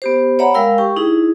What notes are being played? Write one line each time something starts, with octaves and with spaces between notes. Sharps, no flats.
B3 G4 C5
C#5 D5 E5 F#5 A#5 B5
G#3 A#4 F5 G5 E6
G4 G5 C#6
D#4 E4 G#4